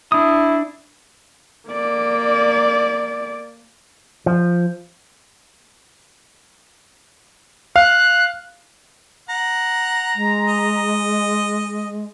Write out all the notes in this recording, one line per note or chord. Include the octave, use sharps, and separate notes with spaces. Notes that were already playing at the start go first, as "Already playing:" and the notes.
D4 E4 D#6
A#3 D5
F3
F5 F#6
F#5 A#5
G#3
D#5